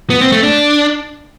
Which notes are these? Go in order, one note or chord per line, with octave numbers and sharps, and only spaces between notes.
B3
C4
A3
D4